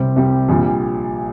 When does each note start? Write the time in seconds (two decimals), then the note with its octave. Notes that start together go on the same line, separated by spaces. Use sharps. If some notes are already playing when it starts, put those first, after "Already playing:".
Already playing: C2 C3 G3 C4 G4
0.16 C2 C3 G3 C4 G4
0.49 A#1 A#2 G3